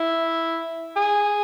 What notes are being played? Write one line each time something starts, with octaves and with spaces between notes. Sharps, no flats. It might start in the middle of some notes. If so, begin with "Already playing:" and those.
Already playing: E4
G#4